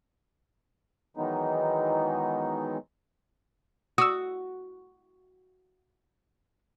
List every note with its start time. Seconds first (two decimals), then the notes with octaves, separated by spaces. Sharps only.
1.17 D#3 E3 F#3 G#3 B3 D#4
3.98 F#4 D#6 E6